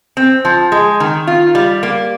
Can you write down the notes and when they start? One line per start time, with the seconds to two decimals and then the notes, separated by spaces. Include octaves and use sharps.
0.17 C4
0.45 F3
0.72 G#3
1.00 D#3
1.27 F4
1.55 G3
1.83 A#3